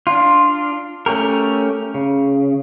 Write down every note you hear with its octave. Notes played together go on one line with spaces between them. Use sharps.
D4 F4
A3 C#4 G4 A#4
C#3